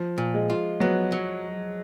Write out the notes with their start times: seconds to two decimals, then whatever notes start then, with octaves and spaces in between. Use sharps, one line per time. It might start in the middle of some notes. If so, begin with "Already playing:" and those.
Already playing: F3
0.18 A#2
0.34 G#3
0.50 F4
0.80 F#3 B3
1.12 F#3